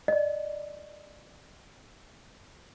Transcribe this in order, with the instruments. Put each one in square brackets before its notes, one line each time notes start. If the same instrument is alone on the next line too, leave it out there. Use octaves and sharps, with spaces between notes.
[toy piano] D5 D#5